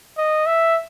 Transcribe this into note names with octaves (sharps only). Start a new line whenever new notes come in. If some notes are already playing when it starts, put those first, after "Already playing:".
D#5
E5